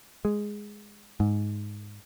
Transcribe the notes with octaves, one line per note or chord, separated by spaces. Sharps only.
G#3
G#2